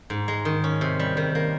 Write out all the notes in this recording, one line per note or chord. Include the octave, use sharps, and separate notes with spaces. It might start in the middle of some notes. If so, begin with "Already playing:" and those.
G#2
G#3
D#3
C#4
C3
G3
D#3
A#3